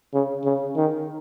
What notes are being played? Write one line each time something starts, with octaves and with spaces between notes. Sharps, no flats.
C#3
C#3
D#3